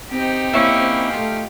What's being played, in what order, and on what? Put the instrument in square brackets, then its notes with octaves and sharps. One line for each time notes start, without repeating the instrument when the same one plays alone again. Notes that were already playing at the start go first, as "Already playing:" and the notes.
[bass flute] C4 [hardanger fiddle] D#4 G4
[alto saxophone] A#3 [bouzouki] C#4 E4
[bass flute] A3 [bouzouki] F4